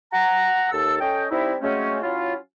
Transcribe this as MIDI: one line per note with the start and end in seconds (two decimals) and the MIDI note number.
0.12 0.71 78
0.12 0.71 82
0.71 0.96 39
0.71 0.96 69
0.71 0.96 88
1.00 1.24 61
1.00 1.24 69
1.00 1.24 75
1.00 1.24 79
1.31 1.54 55
1.31 1.54 60
1.31 1.54 63
1.31 1.54 64
1.61 1.99 54
1.61 1.99 56
1.61 1.99 57
1.61 1.99 60
1.61 1.99 61
2.03 2.35 54
2.03 2.35 61
2.03 2.35 64
2.03 2.35 65